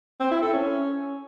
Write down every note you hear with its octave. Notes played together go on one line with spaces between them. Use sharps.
C4
E4
A4
C#4